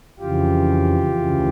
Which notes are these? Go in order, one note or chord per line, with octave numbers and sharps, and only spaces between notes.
F2 C#3 E3 F4 G4
D2 C#3 E3